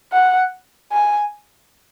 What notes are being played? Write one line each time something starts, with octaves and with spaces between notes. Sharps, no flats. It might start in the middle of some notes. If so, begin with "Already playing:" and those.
F#5
G#5